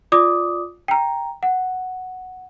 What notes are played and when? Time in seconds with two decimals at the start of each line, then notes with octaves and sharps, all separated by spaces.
0.12 F4 D5 D6 D#6
0.88 G5 A#5
1.43 F#5